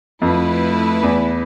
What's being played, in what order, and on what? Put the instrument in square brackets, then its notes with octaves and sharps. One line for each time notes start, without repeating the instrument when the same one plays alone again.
[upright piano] F2 [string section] A3 E4 B4
[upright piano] E2